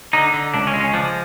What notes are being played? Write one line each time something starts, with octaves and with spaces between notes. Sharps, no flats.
D3 D#4
D3
C#2 D4
C#4
G#3
C#4
F3 D4